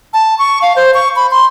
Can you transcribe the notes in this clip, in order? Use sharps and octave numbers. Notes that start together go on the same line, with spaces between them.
A5
C#6
F5
C5
C#6
B5
C6